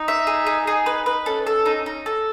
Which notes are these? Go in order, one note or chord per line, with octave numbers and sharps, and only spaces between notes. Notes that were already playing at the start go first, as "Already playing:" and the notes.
Already playing: D#4
E5
G#4
G#4
G#4
B4
B4
C#4 A4
A4
D#4
D#4
A4